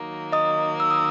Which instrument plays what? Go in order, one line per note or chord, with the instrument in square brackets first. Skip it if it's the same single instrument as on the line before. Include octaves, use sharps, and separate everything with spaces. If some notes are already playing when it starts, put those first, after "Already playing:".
Already playing: [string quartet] D#3 F#3 A#3 D#4
[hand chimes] D#5 D#6
E6
D#6